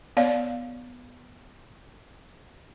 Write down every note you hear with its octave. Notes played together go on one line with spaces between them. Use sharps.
B3 C#5 D5 F5